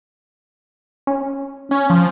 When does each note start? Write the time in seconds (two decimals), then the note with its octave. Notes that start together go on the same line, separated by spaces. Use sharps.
1.07 C#4
1.71 C#4
1.90 F3